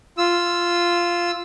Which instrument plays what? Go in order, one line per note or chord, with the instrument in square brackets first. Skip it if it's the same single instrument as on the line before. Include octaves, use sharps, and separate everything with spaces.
[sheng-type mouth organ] F4 E6